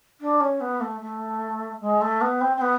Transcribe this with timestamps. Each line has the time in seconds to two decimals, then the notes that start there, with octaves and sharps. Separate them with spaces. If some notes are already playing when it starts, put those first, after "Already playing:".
0.20 D4
0.40 C#4
0.60 B3
0.80 A3
1.01 A3
1.80 G#3
2.01 A3
2.21 B3
2.40 C4
2.56 C4
2.61 B3